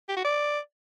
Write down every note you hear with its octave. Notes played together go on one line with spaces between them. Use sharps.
G4
F#4
D5